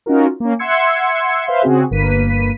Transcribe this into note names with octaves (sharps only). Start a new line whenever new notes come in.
C#4 D#4 F4 F#4 A#4
A#3 C#4
E5 F#5 C6 E6 G#6 C#7
B4 C5 E5 F5 C6
C#3 C4 F#4 G#4
G1 A#3 B4 B6 D#7